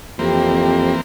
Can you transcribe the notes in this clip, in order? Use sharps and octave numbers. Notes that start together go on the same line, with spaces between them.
F2 E3 A#3 C4 G4